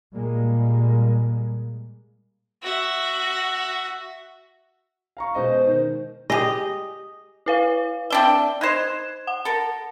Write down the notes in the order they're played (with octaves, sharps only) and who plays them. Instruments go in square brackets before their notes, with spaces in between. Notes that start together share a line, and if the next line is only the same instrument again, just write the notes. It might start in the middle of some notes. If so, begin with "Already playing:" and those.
[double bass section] A#2 G3 G#3 A#3
[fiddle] F#4 E5
[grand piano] F5 A#5 C#6
[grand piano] B2 G#3 D#5 [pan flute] C5
[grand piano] D#3
[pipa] G4 G#4 [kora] D#5
[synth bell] E4 B4 F5
[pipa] C4 D4 E5 [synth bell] G7
[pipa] D#4 C5 [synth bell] F#6 G#6 E7
[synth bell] F#5
[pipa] A4 A#4